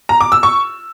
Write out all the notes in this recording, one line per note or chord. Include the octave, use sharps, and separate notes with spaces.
A#5
D6
E6
C#6